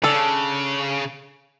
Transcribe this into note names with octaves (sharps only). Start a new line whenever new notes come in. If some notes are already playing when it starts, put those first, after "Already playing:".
C#3 D4 A4